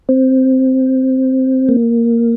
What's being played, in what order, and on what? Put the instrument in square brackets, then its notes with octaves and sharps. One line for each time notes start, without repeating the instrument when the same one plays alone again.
[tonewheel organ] C4
A#3